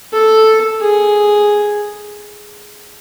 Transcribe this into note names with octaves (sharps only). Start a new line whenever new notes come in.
A4
G#4